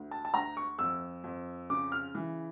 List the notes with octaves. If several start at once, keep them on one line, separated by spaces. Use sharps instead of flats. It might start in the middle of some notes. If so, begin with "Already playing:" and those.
Already playing: D2
A5
A5
D2 A#5
C#6
F2 E6
F2
C#3 D6
F6
E3